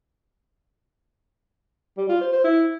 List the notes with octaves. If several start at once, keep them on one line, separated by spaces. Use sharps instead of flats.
G3
F4
C5
C5
E4